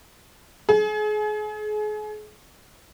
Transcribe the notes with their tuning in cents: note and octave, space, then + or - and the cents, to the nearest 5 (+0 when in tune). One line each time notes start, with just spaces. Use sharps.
G#4 +35